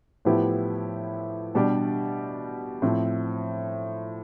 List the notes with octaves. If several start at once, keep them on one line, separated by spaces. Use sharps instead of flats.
A2 F3 B3 E4 G4
B2 G3 D4 G4 D5
A2 F3 C4